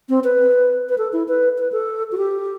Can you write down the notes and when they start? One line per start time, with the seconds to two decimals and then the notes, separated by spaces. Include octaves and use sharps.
0.09 C4
0.24 B4
0.89 B4
0.98 A4
1.13 E4
1.28 B4
1.58 B4
1.72 A4
2.12 F#4
2.17 G4